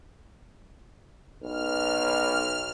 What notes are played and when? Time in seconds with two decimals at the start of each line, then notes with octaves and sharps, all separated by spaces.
1.43 B1 F6